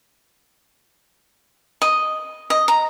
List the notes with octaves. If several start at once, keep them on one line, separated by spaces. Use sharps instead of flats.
D#5
D#5
A#5